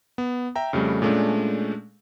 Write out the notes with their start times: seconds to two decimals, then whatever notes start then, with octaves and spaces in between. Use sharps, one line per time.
0.18 B3
0.55 E5 G5 A#5
0.73 F2 C#3 G3 A3
1.02 A#2 G#3 A3 C#4 D4